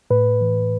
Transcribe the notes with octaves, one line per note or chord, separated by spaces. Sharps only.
A2 B4
E3